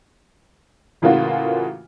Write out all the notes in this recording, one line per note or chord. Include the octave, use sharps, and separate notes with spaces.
A2 C#3 E3 A#3 F4 F#4